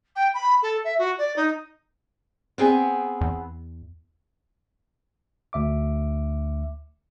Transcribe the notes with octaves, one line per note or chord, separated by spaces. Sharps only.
G5
B5
A4
E5
F#4
D5
D#4
B3 C4 G#4
E2
D2 E5 D6